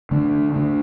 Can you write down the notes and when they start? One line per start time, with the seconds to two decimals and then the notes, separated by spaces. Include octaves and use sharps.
0.11 D3 A3 D4
0.54 D3 A3 D4